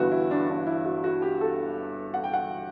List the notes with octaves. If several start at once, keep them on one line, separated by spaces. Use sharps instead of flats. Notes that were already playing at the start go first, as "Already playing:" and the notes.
Already playing: G1 G2 E3 F#4
E4
D4
D4
E4
F#4
F#4
G4
A4
F#5
G5
F#5